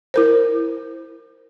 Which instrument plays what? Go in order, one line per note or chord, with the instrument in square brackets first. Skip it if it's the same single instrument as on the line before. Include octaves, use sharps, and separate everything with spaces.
[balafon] E4 A#4 C5